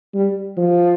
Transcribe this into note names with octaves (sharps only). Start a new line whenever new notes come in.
G3
F3